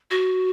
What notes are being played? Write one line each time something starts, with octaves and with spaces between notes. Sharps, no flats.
F#4